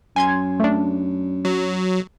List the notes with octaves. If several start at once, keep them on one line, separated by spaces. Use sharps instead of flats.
F#2 G#5 C6 G#6
A3 D4
F#3